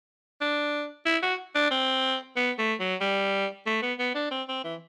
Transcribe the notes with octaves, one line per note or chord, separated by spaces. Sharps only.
D4
E4
F#4
D4
C4
B3
A3
F#3
G3
A3
B3
B3
D4
C4
C4
E3